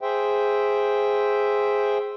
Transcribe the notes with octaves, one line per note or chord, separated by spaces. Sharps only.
G#4 C5 E5 G5